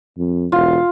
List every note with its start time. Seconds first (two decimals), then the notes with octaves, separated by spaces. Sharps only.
0.18 F2
0.52 E1 F4